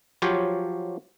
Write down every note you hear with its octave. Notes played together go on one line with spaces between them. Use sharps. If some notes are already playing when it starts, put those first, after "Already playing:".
F3 F#3 F4 G4 C5 C#5